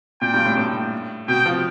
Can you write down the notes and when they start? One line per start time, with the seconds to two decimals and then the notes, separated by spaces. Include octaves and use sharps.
0.22 A#2 G5
0.34 G2
0.45 A2
0.57 A2
1.28 B2 G5
1.46 F3